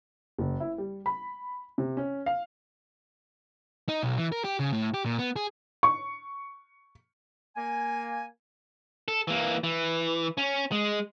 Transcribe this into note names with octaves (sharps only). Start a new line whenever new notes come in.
F#1
E4
G3
B5
C3
C#4
F5
D#4
B1
E3
A#4
G4
C#3
A2
G4
A#2
B3
G#4
C#6
A#3 G#5
A4
E3 A#3
E3
C#4
G#3